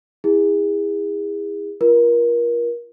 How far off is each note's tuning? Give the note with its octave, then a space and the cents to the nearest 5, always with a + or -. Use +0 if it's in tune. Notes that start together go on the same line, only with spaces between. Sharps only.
E4 -15 G#4 -30
F4 -25 A#4 +30